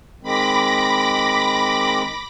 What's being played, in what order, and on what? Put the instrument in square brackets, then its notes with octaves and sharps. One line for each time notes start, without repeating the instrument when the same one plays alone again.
[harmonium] D#3 G#3 C4 [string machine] B5 D6 A#6